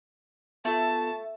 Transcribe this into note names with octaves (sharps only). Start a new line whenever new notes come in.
A3 B3 F4 A4 A5